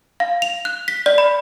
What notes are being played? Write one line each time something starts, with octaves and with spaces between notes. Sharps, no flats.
F5
F7
F#6
B6
D5
B5